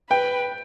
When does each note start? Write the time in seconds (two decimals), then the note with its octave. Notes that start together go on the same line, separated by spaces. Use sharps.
0.09 B4 G5